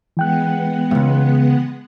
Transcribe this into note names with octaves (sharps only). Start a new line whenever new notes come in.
E3 G#3 B3 F#5 G5 F#6
C#2 G2